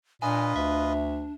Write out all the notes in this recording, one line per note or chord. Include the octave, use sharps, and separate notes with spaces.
A#2 D4 F4 B4 D#5 G#5
D2 E5